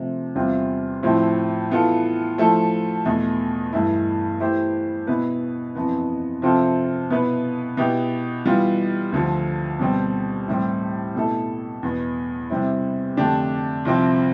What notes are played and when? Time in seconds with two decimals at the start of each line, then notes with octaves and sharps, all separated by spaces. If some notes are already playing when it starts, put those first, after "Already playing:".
Already playing: C3 F3 A3
0.35 E2 C3 G3 C4 F4
1.03 A2 F3 C4 E4
1.70 E3 B3 F4 A4
2.38 F3 A3 E4 A4
3.05 E2 B2 A3
3.73 G2 E3 A3 E4
4.40 E3 A3 E4 G4 C5
5.07 B2 B3 E4 B4
5.75 F2 E3 B3
6.42 C3 F3 C4 F4 A4
7.10 B2 B3 E4 B4
7.77 B2 B3 E4 G4
8.45 E3 G3 B3 F4
9.12 D2 D3 F3
9.79 B2 G3 C4
10.48 A2 E3 G3 C4
11.15 B2 A3 E4 A4
11.83 E2 B2 B3
12.50 C3 G3 C4 E4
13.17 F2 D3 A3 D4 G4
13.85 C2 C3 F3 C4